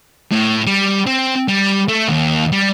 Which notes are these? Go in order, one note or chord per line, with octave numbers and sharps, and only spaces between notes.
A2
G3
C4
G3
A3
D#2
G3